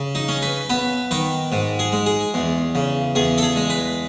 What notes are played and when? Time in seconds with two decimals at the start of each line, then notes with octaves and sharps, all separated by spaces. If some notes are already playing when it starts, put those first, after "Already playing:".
Already playing: C#3
0.15 D#4
0.29 C#4
0.42 B4
0.69 B3 B4
1.11 D#3 B4
1.52 G#2
1.79 G#4
1.92 G#3
2.06 G#4
2.34 E2
2.75 C#3
3.15 E2 G#4
3.38 A4
3.43 G#4
3.56 G#3
3.70 B4